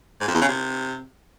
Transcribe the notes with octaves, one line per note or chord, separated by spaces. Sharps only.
G#2
F2
E2
C#3
C3